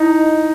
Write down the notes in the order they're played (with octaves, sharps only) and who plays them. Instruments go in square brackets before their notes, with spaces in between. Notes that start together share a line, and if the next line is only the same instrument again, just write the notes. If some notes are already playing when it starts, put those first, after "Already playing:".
Already playing: [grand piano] D#4 [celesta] E4 D#5